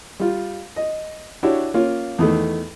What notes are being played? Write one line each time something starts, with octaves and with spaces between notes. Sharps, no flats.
G3 F4
D#5
D4 E4 F#4 G4 C#5
A#3 C#4 F4
E2 D#3 A3